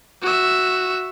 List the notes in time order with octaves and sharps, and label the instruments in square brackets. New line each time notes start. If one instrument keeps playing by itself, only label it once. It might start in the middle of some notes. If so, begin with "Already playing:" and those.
[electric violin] F#4 E5